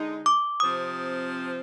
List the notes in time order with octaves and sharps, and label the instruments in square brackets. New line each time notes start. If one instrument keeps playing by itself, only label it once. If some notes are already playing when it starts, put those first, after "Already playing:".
Already playing: [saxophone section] D3 G#3 D#4
[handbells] D6
[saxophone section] C3 F3 C4 [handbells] D#6